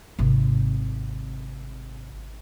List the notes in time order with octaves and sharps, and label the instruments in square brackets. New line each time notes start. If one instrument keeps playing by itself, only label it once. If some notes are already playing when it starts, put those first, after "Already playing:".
[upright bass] G#1 C3